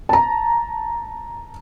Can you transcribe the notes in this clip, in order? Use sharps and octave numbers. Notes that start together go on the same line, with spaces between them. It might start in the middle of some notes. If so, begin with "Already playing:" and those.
A5 A#5